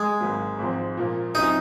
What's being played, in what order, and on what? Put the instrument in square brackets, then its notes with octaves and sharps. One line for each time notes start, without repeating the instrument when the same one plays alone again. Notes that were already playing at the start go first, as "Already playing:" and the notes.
Already playing: [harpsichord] G#3
[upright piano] G#1 G#2 F#3 A#3
G#1 G#2 F3 C4
A#2 F3 A#3
[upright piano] C3 F#3 C#4 F4 [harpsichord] D#4